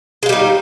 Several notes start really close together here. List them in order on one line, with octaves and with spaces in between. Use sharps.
G#3 F4 G3 D#4